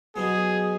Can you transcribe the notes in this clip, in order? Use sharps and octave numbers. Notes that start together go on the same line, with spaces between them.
B2 F#3 B3 G#4